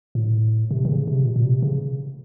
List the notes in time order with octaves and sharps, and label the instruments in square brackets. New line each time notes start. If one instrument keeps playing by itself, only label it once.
[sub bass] A2
C3
D#3
C#3
C3
A#2
A#2
C3
C#3